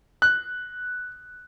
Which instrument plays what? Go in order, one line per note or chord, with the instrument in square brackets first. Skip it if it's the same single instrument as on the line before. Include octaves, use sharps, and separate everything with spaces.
[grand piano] F#6